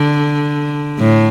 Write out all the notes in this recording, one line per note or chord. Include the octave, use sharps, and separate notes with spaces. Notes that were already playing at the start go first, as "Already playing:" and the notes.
Already playing: D3
A2